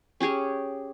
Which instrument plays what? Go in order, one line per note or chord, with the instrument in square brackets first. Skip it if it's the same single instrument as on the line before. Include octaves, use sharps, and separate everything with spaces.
[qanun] C#4 G4 G#4 C#5